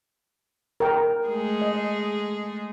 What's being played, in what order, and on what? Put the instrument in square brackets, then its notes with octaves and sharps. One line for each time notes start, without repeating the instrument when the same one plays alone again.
[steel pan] A#4 G5
[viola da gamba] G#3 A3 G#4
[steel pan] D#5